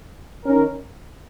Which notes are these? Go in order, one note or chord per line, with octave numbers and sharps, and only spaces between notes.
D#3 C#4 A#4